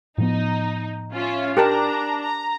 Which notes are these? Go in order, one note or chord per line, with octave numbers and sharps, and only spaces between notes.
A2 F3 B3 D#4
C#4 F4 E5
D4 G4 A#4 A5 A#5
A#5